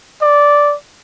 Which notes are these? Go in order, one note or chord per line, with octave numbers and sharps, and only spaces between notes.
D5